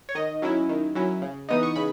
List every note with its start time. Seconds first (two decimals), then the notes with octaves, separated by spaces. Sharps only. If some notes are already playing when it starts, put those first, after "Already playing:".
0.09 C#5
0.15 D#3 D#5
0.42 F#3 C#4 E4
0.69 D#3
0.95 F#3 C#4 E4
1.22 C#3
1.49 E3 B3 D#4 D#6
1.63 C#6
1.76 C#3 B5